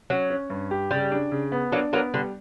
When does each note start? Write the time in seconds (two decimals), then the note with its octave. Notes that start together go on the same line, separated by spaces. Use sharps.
0.10 F#3 C#4
0.30 C#4
0.50 G2
0.71 G4
0.91 C#3 G3
1.12 D4
1.32 C#3
1.52 B3
1.72 F#3 A#3 D4
1.93 F#3 A#3 B3
2.14 D3 G3